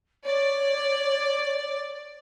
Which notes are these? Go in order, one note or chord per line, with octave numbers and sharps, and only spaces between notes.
C#5 D5